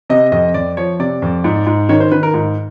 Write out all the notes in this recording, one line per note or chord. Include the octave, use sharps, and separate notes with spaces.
C3 D#5
F2 D#5
F2 D5
F3 C#5
C3 D5
F2
G#2
G#2
D#3 C#5
C5
D#3 B4
A#4
G#2